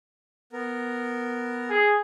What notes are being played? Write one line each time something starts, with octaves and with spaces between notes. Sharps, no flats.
B3 A#4
G#4